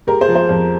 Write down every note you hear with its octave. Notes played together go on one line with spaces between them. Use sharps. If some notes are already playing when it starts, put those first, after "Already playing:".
G#3 G4 A#4
G#4 C5
F3
G#4 C5
F2